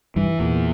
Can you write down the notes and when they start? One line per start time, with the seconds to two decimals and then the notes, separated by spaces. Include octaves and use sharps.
0.16 G2 E3
0.39 E2 A#2